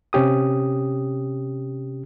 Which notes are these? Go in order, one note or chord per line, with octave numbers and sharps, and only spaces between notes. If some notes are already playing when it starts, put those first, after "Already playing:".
C3 C#4 G4 D#6